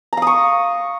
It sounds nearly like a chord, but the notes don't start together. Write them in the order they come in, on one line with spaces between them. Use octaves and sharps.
A#5 F5 D#6 C#6